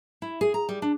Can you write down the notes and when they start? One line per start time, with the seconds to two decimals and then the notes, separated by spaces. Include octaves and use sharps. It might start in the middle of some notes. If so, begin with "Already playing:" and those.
0.22 E4
0.41 G#4
0.54 A#5
0.69 G3
0.82 D4